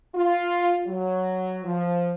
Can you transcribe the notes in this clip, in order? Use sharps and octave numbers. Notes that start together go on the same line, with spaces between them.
F4
F#3
F3